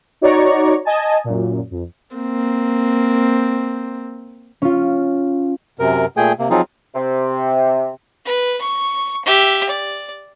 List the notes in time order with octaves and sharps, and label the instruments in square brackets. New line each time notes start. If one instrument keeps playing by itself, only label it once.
[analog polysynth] D#4 F#4 C#5 D5 A#5 C#6
D#5 G#5 A5
F#2 A#2
F2
[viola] A#3 C4
[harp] C#4 F4
[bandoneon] F#2 C3 A#4
A#2 A3 G#4 G5 G#5
C3 A#3
F3 F#3 C4 D#4 F4 G#4
[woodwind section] C3
[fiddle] B4
C#6
G4 E5
D5